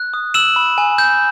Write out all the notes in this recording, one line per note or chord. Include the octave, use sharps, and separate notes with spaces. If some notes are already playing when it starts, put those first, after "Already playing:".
Already playing: F#6
D#6
E6 E7 F#7
B5
G#5
G6